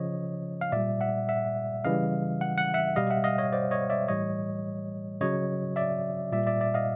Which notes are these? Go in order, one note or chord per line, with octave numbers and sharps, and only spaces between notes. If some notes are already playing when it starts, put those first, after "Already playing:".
Already playing: C#3 F3 C#5 D#5
F5
A#2 G3 D5 E5
E5 F#5
E5 F#5
C#3 E3 G3 D#5 F5
F#5
F#5
E5 F#5
B2 G3 D#5 F5
E5 F#5
D#5 F5
C#5 D#5
C5 D5
C#5 D#5
D5 E5
A2 E3 G3 C#5 D#5
C#3 F#3 C#5 D#5
D5 E5
A#2 G3 D5 E5
D5 E5
D5 E5
D#5 F5